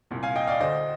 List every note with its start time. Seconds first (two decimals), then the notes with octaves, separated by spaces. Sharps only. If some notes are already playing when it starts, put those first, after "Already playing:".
0.11 C2 A#2
0.23 F5 G#5
0.36 D#5 G5
0.47 D5 F5
0.60 D2 D3 C5 D#5